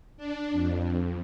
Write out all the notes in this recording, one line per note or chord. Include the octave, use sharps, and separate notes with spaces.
D4
F2